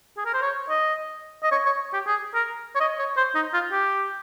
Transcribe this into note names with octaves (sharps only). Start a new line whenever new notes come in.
G#4
A#4
C5
C#5
D#5
D#5
C#5
C#5
G4
G#4
A#4
C#5
D#5
C#5
C5
D#4
F4
G4